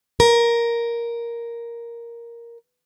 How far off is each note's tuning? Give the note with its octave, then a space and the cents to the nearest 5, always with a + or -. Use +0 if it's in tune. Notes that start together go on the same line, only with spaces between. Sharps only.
A#4 +5